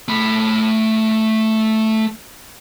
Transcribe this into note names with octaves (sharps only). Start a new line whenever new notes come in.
A3 B5